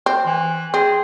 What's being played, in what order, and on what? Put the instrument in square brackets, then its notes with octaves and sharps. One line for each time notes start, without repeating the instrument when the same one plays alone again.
[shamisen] C4
[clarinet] E3
[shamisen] C4 [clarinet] G#4